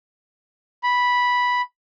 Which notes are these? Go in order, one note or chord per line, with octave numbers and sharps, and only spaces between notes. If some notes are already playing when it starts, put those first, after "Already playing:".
B5